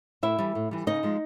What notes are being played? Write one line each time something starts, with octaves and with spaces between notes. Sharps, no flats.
A2 E4 E5
E3 G3
A2
E3 G3
C#3 D#4 D#5
F3 G#3